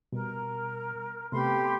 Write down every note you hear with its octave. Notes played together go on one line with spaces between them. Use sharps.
B2 G3 A#4
C3 A3 B3 G4 B5 C6